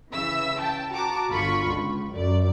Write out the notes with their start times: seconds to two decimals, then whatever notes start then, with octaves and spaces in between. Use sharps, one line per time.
0.12 C#3 E3 E5 E6
0.59 G5 A5
0.90 F#4 A5 A#5 D6
1.29 G1 D3 F4 B5 C#6
1.66 C#2
2.14 F#2 D5